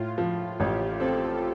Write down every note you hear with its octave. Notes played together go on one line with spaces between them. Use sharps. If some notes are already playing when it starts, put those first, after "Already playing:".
Already playing: A2 F4
F3
A1 G4
C4 A4